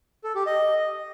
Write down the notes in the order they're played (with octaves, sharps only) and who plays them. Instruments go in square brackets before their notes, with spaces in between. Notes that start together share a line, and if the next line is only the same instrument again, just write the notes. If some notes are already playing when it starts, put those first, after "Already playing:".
[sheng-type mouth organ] A4
G4
D#5